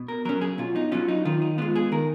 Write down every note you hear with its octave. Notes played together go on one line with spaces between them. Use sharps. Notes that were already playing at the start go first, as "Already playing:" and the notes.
Already playing: B2
A#4
F#3 C#4 A#4
G#4
B2 F4
D#4
F#3 C#4 F4
D#4
D#3 F4
D#4
G#3 B3 F4
G#4
D#3 A#4